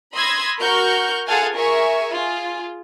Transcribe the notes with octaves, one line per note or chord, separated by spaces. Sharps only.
B5 C6 D#6 E6 G#6 A#6
F#4 A#4 C#6 F6 G6
F4 G#4 A4 F5 F#5 G#5
G#4 A#4 E5 G#5 C#6
F4 G#4